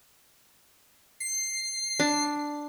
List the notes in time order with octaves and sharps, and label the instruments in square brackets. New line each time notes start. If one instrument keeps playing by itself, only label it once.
[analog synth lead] C7
[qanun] D4